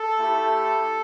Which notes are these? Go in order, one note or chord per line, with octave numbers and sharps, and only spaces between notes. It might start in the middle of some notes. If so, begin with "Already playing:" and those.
Already playing: A4
A3 E4 G4